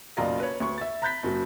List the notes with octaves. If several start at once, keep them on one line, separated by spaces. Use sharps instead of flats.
F#1 B1 F4 D5 D#5 A#5
B4 C#5
D2 C#6
E5 A6
A#5 B5 F#6 G6 A6 B6
F#1 F#3